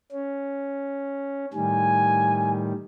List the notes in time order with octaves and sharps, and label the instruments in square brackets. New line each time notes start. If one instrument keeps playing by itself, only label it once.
[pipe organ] C#4
[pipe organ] A2 D#3 G3 [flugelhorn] G#5